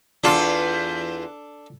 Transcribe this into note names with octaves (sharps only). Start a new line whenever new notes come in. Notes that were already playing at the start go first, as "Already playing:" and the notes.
E2 D4 F4 A4